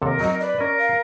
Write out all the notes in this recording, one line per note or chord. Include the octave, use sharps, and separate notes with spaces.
D#2 C3 A4 A#4
F#3 C4 F#4 D#5
B4 D5
C#4 A#4 D#5
F5